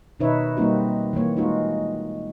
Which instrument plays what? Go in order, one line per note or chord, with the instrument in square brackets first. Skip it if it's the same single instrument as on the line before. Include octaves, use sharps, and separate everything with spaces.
[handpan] B2 D#3 D#4 B4 C#5 E5
G3 A#3 C4 D#4 F#4
E3 A#3 C#5
G#3 D#4 F4 F#4